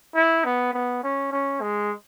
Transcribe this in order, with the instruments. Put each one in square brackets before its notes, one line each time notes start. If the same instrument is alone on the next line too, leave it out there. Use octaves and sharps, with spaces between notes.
[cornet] E4
B3
B3
C#4
C#4
G#3